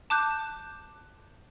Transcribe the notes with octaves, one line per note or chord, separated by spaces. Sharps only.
A5 D6 F#6 G6